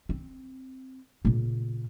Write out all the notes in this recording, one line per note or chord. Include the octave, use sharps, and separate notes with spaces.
C4
A#2 C#3